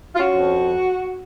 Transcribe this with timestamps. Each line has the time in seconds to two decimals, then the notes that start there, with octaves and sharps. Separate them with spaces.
0.15 F4
0.19 C#4 F#4
0.36 F2